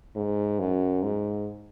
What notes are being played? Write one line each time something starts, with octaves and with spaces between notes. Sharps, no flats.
G#2
F#2
G#2